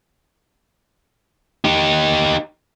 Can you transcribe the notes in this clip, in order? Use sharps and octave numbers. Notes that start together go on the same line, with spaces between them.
D#4 G4